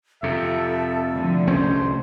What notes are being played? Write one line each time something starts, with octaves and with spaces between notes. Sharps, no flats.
F2 C3 A4 E5
A2 D3 F3
C2 A3 C#4 C5